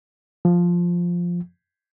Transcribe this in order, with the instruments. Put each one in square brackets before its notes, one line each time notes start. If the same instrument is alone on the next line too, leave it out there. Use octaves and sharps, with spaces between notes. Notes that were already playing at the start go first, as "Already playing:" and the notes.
[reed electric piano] F3